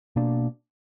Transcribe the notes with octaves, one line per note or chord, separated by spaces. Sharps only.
B2 A#3 D4